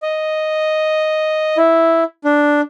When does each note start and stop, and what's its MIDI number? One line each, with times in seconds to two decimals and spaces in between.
0.03 1.57 75
1.58 2.04 64
2.25 2.61 62